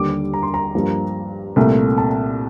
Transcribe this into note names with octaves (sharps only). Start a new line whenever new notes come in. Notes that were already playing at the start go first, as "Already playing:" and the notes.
Already playing: D#2 D3 G3 D6
A#5
C6
A#5
G2 F3 A#3
C2 A#2 A3
A5